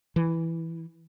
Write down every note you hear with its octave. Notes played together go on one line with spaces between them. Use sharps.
E3